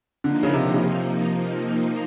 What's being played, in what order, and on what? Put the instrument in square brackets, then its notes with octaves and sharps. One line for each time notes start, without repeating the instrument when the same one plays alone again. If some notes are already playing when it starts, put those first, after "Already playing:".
[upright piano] D3 [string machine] F3 A#3 D#4
[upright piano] C#3
C3
D3
C#3
C3